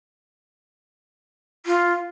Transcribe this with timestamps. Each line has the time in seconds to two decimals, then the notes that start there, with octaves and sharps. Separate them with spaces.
1.66 F4